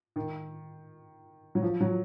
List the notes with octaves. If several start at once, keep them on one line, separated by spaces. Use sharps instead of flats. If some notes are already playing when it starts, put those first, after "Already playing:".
D#3
F#3
F3
F#3